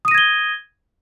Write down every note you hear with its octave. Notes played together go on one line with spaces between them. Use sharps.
D#6 G#6 A#6 D#7 G7